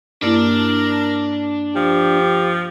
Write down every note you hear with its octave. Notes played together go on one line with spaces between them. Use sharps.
G2 A#3 D4 E4 A#4 D5
F3 G4